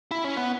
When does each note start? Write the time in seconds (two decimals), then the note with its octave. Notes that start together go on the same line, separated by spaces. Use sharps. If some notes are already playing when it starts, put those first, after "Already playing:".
0.11 E4
0.24 C#4
0.37 B3